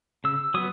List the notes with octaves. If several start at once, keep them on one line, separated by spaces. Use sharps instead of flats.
C#3 E6
F#3 B3 D#6